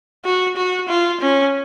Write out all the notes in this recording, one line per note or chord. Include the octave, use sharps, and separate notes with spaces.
F#4
F#4
F4
C#4